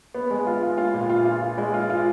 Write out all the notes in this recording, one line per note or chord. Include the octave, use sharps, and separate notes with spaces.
B3
G#3
F4
F4
F4
A#2
F4
F4
F4
G#3
F4
F4